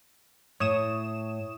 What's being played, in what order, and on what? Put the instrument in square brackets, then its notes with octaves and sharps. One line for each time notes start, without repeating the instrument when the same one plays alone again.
[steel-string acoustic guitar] A2 [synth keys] C#5 D#6 E7